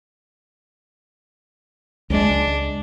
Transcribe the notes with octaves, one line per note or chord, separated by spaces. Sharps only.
C#2 G#3 D4